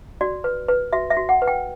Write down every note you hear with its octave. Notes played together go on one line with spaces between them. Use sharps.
F#4 D5
B4
B4
F#4 E5
E5
F#4
F#5
B4
G5